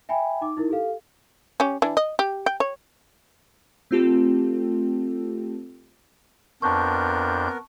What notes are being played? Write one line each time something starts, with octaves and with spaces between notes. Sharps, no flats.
E5 G5 G#5 B5
D#4 D6
D#4 E4 A#4
G4 A4 F5
C#4 G4
E3 D4
D#5
G4
G5
C#5
A3 C4 F4 G4 A4
F2 B3 D4 A#4 A5 C#6 G6